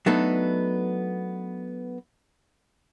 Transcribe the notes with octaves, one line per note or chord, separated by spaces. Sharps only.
F#3 A3 B3 D4 D#4 A4